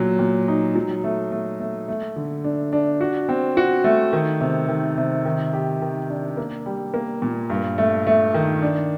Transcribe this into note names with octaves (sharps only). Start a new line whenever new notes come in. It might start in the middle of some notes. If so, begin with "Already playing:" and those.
Already playing: A#2 F#3
A#2
D#4
F#3
A3
A3
A3
A3
D3
D4
D4
F#4
C4
F#4
A3
D#3
C3
D#3
C3
D#3
G4
D#3
D4
A#3
G3
A#3
A#2
G2
A3
A3
D#3
D4